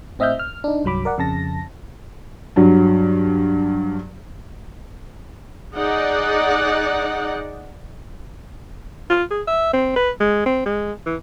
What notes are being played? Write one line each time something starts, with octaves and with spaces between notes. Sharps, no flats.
A2 C4 D#5 E5 F6 G6
F6
D4 D#4
C2 G2 F#3 B5 D6
A#4 D5 F#5
F2 C#3 A5 A#6
G2 F#3
D#4 G#4 D5 F#5
F4
G#4
E5
C4
B4
G#3
C4
G#3
E3